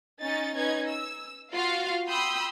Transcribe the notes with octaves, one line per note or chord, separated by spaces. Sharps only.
C#4 D#4 A6
C#4 D#4 B4 G#6
E6
F4 F#4 F5
G5 B5 C6 D#6 E6 G6